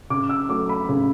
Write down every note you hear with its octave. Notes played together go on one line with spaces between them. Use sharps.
C#3 D6
E6
F#3 A3 D6
B5
C#3